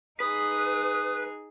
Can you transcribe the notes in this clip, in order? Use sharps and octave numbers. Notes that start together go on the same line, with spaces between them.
D#4 G#4 B4 D#6